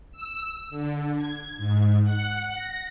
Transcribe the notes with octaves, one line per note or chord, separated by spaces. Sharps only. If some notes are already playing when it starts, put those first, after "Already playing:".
E6
D3
G#6
G#2
F#5
A#6